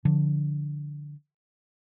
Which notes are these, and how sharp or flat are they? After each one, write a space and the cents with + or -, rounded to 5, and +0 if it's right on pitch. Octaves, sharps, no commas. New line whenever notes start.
D3 +0 F3 +0